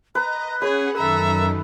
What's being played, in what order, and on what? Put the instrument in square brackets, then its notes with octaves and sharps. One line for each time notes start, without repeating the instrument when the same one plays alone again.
[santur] B4 [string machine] D#5 [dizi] A#5
[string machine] C#4 F#5 [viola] G#4 [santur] B4 [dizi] C#5
[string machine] F#2 D#3 [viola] A4 E5 [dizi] A#5